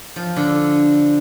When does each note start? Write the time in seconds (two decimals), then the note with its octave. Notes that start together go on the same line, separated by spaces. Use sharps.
0.16 F3
0.36 D3